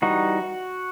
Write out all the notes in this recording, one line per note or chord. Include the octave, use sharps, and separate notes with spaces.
E3 G3 D#4 F#4